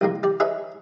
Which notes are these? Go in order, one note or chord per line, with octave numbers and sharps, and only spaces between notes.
C2 F2 G#2 A#3
G3 D5
D#4 G#4 B4 C#5 E5